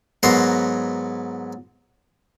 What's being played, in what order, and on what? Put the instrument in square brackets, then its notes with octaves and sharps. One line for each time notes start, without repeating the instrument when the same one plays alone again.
[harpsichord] G#2 F#3 B3 A#4 C6